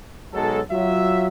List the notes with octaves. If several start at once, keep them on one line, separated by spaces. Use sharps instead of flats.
B1 F#3 G#3 A4
F#3 F4 E5